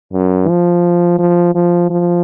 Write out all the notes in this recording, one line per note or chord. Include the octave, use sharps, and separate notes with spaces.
F#2
F3
F3
F3
F3